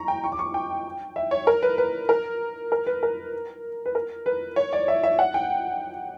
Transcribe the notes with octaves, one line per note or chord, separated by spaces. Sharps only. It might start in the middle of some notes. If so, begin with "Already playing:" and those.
Already playing: A#5 C#6
G5
C#6
D6
C#6
G5
E5
C#5
A#4
B4
B4
A#4
A#4
B4
A#4
B4
A#4
B4
C#5
D5
E5
E5
F#5
G5